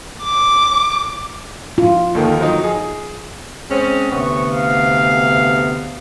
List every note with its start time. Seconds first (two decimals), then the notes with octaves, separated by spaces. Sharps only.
0.23 D6
1.78 F4
2.15 D#2 D3 D#3
2.39 F3 F#3 D#4
2.64 G#4
3.70 G#3 C4 C#4
4.12 D2 C3 B3 C#6
4.52 F5